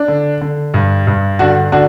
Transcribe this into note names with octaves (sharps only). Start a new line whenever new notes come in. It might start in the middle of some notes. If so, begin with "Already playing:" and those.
Already playing: D4
D3
D3
G2
G2
D3 D4 F#4
D3 D4 F#4